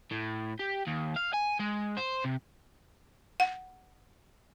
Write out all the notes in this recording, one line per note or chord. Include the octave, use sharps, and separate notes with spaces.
A2
G4
D#2
F5
G#5
G#3
C5
C3
F#5